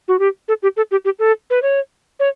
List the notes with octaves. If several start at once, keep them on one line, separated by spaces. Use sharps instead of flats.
F#4
G4
A4
G4
A4
G4
G4
A4
B4
C#5
C#5